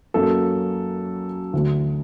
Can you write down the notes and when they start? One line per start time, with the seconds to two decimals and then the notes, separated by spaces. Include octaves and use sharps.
0.14 F#2 F#3 A#3 A4
1.53 D2 D3 A3 F#4